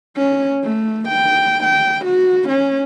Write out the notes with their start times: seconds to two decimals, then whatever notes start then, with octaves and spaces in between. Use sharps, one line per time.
0.17 C#4
0.63 A3
1.08 G5
1.63 G5
2.05 F#4
2.49 C#4